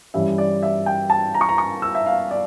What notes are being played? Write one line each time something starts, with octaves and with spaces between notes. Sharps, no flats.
G2 E3 G3 C#4 E5
D5
E5
G5
A5
A#5
C#6
A#5
C#6
E6
E5
F5
D5